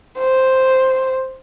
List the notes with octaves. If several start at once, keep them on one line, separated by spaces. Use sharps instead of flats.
C5